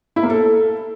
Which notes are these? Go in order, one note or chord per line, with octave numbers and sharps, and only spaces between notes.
E4
A#3
A4